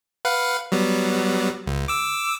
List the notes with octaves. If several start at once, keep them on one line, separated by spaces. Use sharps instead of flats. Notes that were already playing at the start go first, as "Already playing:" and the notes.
B4 F5 F#5
F#3 G3 B3
C#2
D6 E6